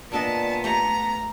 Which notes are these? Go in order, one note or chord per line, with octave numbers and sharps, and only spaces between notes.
A#2 B3 D4 A4 D#5 A5
A3 G4 A#5